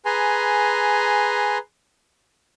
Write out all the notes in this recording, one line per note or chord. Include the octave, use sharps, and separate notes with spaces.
G#4 B4 G#5 A#5 C6